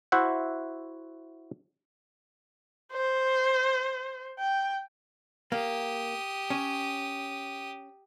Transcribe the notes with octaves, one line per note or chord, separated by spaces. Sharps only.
E4 F#4 C5 E5 F#5
C5
G5
A#3 G4 D#6
C#4